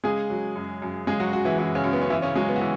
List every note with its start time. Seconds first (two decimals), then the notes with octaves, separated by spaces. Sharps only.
0.04 C#3 G#3 G#4
0.30 F#3
0.55 F#2
0.82 F#2
1.07 C#3 G#3 G#4
1.20 F#3 F#4
1.33 F#3 F#4
1.45 E3 E4
1.58 F#2 E3 E4
1.75 C#3 C#4
1.84 F#2
1.93 B3
2.02 C#4
2.10 C#3 E3 E4
2.22 C#3 C#4
2.35 F#3 G#3
2.49 B3
2.56 F#4
2.61 E3